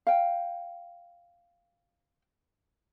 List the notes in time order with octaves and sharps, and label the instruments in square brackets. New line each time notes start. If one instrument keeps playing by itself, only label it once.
[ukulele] F5 G5